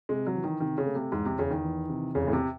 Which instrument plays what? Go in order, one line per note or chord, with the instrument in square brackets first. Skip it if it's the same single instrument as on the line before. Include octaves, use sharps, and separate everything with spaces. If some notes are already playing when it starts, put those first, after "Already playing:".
[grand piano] C3 [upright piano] G#3
[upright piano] F#3
[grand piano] E3
[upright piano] D#3
[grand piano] C3 [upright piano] D#3
[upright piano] C#3
[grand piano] A3
[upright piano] C3
[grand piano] E2 [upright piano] G#2
[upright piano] C3
[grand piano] E2 [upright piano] C#3
[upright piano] D#3
[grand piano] E3
C3
[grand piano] E2 [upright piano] C#3
[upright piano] A2
C3